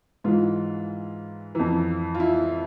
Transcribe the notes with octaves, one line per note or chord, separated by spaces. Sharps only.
G#2 E3 F4
F2 E3
F4
E4